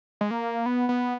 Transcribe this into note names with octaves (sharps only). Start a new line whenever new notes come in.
G#3
A#3
B3
B3